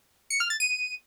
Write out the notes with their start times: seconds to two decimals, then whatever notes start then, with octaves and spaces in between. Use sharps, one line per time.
0.30 C#7
0.40 F6
0.50 A6
0.60 D#7